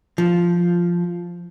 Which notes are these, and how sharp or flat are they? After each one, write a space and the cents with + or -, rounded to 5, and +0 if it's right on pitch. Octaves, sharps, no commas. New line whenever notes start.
F3 -5